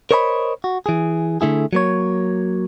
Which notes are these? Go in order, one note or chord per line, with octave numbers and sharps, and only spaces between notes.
A#4 C5 C#5 D#5 A#5 B5
F#4
E3 G#4
D3 A3 E4 G#4
F#3 A#3 C#5